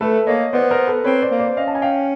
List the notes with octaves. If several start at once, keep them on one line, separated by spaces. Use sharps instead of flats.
A3 A4 B4
A#3 C#5 D#5
B3 C5 D5
A#4 C5
A4 B4
C4 B4 C#5
C5 D5
A#3
C5 D5
C#4 D#5 F5
A5
G#5
F5 G5